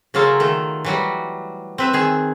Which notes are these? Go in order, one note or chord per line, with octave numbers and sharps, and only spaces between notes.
C#3 F#3 A#3 F4 A4
D#3 A3
E3 F#3 G3
C4 B4 E5
D#3 G#4